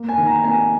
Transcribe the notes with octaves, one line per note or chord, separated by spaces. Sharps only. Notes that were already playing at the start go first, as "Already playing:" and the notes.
Already playing: A#3
G#5
D#3
A#5
A#3 G#5